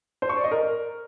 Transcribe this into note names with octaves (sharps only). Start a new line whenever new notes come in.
C5
C#6
D5
D#5
A#4